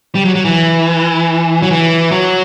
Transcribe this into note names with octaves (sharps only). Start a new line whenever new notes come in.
G3
F#3
F#3
E3
F#3
E3
F#3